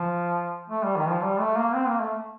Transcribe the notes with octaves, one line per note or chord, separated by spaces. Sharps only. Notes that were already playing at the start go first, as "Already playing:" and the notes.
Already playing: F3
A3
G3
D#3
F3
G3
A3
A#3
C4
A#3
A3